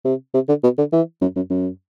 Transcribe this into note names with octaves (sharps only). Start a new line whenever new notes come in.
C3
C3
D3
B2
D3
E3
F#2
F#2
F#2